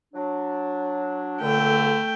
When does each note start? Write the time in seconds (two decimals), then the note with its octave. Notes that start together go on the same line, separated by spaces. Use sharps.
0.14 F#3 D4
1.41 C#2 A#2 D3 A3 G5